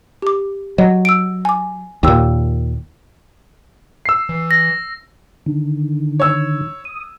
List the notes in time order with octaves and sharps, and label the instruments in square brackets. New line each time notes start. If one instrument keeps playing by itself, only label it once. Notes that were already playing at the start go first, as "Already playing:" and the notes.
[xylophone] G4 D6
[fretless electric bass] F#3 [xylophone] D#5
[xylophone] E6 D7
G#5 D6
[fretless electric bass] D#2 A#2 [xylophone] G5 E6
[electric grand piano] E6 C7
[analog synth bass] E3
[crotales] A#6
[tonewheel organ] D3 D#3
[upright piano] C#5 E6
[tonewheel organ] D#6